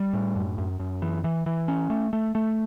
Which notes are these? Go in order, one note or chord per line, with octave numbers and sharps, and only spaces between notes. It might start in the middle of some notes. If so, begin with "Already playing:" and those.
Already playing: G3
A2
F#2
F#2
F#2
E3
E3
E3
C#4
A3
A3
A3